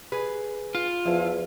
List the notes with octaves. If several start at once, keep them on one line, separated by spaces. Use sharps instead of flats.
G#4 B4
F4
E2 F3 E4